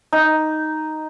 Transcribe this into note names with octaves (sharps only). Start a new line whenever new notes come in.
D#4